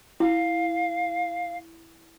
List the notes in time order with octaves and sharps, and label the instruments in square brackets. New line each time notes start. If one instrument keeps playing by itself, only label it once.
[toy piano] E4 [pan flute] F5